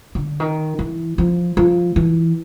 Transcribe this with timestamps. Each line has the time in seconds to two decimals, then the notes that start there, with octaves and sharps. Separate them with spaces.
0.15 D3
0.40 D#3
0.79 E3
1.18 F3
1.57 F3
1.96 E3